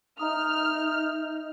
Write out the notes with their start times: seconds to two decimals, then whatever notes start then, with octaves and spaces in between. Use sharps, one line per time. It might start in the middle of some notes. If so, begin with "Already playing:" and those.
0.19 D#4 E5 A#5 D#6 F6